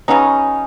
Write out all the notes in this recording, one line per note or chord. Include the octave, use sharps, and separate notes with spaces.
C#3 F#3 B3 C#4 D#4